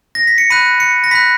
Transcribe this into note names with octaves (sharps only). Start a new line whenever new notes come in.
A#6
B6
C#7
B5 F#6 D#7
C#7
A#6
B5 F#6 B6